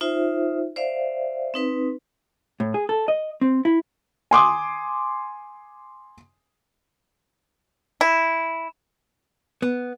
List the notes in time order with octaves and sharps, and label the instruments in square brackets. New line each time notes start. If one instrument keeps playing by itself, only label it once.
[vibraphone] D#4 F4 C5 E5
C5 D5 E5 F5
C4 D#4 B4
[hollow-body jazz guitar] A2
G#4
A4
D#5
C4
E4
[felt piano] G#5 C6 D6 D#6
[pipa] E4
[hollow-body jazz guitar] B3